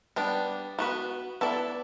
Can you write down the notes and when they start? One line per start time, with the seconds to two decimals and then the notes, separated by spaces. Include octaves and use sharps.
0.16 G3 B3 D4
0.79 B3 F#4 B4
1.41 B3 E4 A4 D5